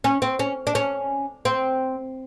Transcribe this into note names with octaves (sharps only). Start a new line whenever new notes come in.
C#4
C4
C#4
D4
C#4
C4